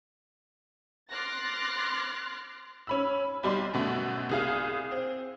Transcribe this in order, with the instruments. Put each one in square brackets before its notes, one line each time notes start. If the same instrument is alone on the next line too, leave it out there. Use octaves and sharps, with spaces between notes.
[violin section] C6 D6 F6 F#6 A6 A#6
[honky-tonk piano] C#4 B5 E6
B1 G3 D5 C6
F#2 B2 A3
C2 G#4 F5
C4